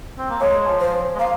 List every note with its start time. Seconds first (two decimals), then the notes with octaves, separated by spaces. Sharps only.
0.18 C4
0.30 A#3
0.41 G#3 C#5
0.67 F3
0.80 C5
1.15 G#3
1.19 A#3 F5